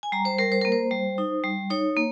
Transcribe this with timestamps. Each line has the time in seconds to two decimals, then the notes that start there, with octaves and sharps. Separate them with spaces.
0.03 G#5
0.12 G3 A#5
0.25 C5
0.38 G3 A#4
0.52 C5
0.62 A#3 A#4
0.72 C5
0.91 G3
1.18 D#4
1.44 G3
1.70 D#4 C#5
1.96 A#3